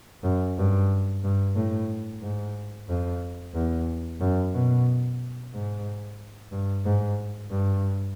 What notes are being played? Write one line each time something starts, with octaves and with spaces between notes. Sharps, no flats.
F#2
G2
G2
A2
G#2
F2
E2
F#2
B2
G#2
G2
G#2
G2